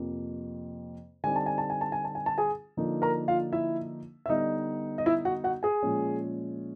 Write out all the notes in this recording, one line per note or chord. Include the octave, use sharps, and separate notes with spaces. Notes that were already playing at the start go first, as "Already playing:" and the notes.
Already playing: F2 C3 F3 A#3
D3 G3 C4 D#4 G#5
A5
G#5
A5
G#5
A5
G#5
A5
G#5
A5
G#4 G#5
D3 F3 A#3 D#4
A#4 A#5
F4 F5
E4 E5
E5
D3 G3 B3 D#4 D#5
D#5
E4 E5
F#4 F#5
F#4 F#5
G#4 G#5
A#2 F3 G#3 C#4